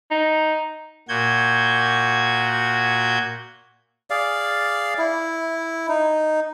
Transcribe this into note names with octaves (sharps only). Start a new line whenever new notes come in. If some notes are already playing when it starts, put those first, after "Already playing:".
D#4
A#2 F#4 G6 G#6
G#4 D5 F5
E4
D#4